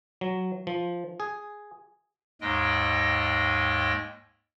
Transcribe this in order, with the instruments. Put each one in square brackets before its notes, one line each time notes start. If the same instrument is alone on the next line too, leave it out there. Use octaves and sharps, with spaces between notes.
[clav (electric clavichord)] F#3
F3
G#4
[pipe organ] D#2 G#2 G#3 D#5 G5